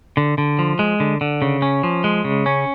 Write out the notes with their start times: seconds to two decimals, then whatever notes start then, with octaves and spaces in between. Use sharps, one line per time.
0.17 D3
0.38 D3
0.59 F3
0.79 G#3
1.00 D3
1.21 D3
1.42 C#3
1.62 C#4
1.83 F3
2.04 G#3
2.24 C#3
2.46 C#4